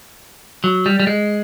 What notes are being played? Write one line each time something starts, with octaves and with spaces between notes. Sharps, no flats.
F#3
G3
G3
G#3